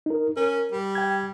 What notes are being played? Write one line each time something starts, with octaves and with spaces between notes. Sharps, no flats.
D#4 A#4
C#4 A#4
G3
G5 G#6